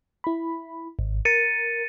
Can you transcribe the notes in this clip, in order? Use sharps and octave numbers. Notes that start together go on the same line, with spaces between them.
E4 B5
G#1
A#4 A6 C#7 D#7